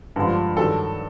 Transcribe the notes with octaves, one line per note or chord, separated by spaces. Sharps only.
G2 D3 F3 G#3
G2 D#3 F#3 A4